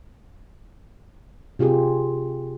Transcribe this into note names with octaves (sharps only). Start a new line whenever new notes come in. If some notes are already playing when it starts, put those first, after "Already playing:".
C3 F4 G4 G#4